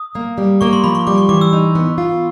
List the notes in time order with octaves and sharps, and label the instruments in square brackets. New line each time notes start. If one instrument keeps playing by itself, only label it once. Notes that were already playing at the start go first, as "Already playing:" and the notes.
Already playing: [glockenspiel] D#6
[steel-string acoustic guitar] A#3
G3
[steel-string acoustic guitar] A#3 [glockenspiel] C#6
[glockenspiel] C6
[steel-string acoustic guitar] F3 [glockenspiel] B5
[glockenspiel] C#6
[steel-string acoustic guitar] G3 [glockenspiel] D6
[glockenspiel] C#6
[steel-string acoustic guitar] E3 [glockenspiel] D6
[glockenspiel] E6
[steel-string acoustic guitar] D#4
B3
F4